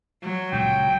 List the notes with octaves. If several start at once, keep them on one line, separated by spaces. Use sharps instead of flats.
F#3
C#2 A#2 C#3 G5